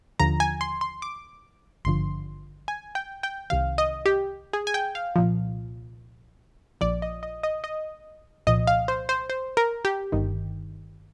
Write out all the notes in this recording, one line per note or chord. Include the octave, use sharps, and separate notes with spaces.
D#2 D3 F3 A#5
G#5
C6
C6
D6
G#1 G2 D3 F3 C6
G#5
G5
G5
C2 C3 D#3 F5
D#5
G4
G#4
G#5
G5
F5
C2 A#2 F3
A#1 A#2 F3 D5
D#5
D#5
D#5
D#5
C2 A#2 F3 D#5
F5
C5
C5
C5
A#4
G4
G1 G2 D#3